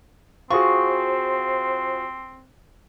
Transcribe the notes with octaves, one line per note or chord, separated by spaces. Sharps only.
C4 F4 F#4 G#4 C5 C#6